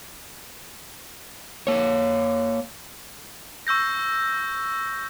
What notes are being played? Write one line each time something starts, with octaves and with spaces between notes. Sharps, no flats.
A#3 C#5
C#6 E6 G6 A#6